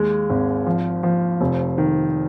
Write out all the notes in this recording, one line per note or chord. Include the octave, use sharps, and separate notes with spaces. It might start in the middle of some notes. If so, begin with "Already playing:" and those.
Already playing: D#2 G#3
G#1
F3
F3
F1
D#3